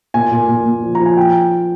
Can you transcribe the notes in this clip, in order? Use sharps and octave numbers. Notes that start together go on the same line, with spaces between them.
A#2 G#5
A#2
A#2
A#2
F3
A#5
F3
G#5
F3 G5